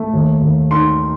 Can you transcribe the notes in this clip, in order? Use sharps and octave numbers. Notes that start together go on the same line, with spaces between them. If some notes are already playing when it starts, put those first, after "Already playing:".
Already playing: A3
D#2
D#2
D#3 C6